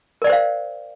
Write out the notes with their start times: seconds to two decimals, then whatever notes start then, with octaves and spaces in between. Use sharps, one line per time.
0.22 A#4
0.24 D5
0.27 G5
0.30 C5
0.32 F5